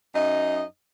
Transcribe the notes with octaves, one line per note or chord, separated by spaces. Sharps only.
F#2 D#4 D#5